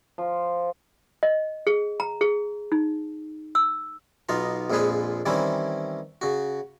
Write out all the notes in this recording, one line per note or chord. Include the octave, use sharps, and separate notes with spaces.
F3
D#5
G#4
A#5
G#4
D#4
E6
B1 B2 D#4 F4 A#5
A#1 F2 A#2 G#3 G#4 B4
D#3 E3 G3 C4 C#4 E4
C#3 F#4